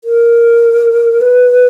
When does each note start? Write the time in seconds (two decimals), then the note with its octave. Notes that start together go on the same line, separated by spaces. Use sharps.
0.04 A#4
1.21 B4